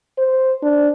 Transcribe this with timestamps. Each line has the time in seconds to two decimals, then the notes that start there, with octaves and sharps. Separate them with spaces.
0.18 C5
0.63 D4